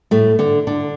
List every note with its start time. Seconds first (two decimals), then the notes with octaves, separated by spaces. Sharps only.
0.11 A2 A3
0.39 D3 D4
0.67 D3 D4